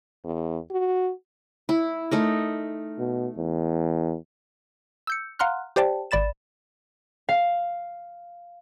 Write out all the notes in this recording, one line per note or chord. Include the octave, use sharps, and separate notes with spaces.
E2
F#4
E4
A3 D#4 A#4
B2
E2
E6 G6 C#7
F5 F#5 A#5 C6 F6 F#6
G4 C5 D5 G5 A5
G#1 D5 B5 A6 E7
F5